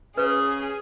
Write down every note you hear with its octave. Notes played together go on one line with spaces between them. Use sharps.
C#3 G#4 B4